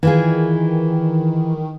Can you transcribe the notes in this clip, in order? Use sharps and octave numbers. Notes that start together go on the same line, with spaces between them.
D#3 E3 F4 G#4